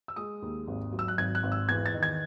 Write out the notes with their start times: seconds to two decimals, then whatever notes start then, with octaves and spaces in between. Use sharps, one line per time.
0.08 E6
0.16 G#3 D#6
0.42 D#2
0.67 G#1
0.93 F#3
0.99 E6
1.08 F#6
1.18 G#1 G#6
1.35 F#6
1.43 G#1
1.52 E6
1.68 E2 G#6
1.86 A6
1.94 D#3
2.03 G#6